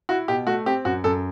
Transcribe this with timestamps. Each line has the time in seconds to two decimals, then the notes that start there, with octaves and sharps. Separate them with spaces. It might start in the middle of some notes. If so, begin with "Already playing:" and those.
0.09 E4 F#4
0.28 B2 G4
0.47 A3 F#4
0.66 C4 G4
0.85 F#2 F#4
1.04 F#2 A4